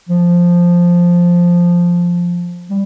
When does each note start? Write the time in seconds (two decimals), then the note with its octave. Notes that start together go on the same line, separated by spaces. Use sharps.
0.09 F3
2.70 G3